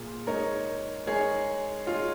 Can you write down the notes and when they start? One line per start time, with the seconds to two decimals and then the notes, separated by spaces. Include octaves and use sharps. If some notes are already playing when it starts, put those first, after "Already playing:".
Already playing: A#2 A#3 F4 G#4
0.27 G#3 D#4 A#4 C#5
1.06 G#3 D#4 G#4 A#4 C#5
1.86 G#3 D#4 F4 C#5